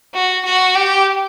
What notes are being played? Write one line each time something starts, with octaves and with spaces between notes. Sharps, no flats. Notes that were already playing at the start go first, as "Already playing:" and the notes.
F#4
F#4
G4